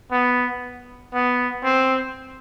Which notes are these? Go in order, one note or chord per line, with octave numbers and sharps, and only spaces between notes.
B3
B3
C4